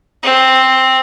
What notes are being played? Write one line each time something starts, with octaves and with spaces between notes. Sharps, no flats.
C4